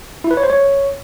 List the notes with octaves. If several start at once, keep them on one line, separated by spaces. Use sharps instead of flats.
E4
B4
C#5
C5
C#5